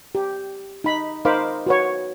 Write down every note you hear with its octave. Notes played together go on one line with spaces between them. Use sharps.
G4
D#4 B5
D#4 A#4 C5 F5 B5 D6
F#4 B4 C#5